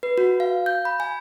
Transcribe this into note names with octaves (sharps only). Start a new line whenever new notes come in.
B4
F#4
F5
G6
B5
G#5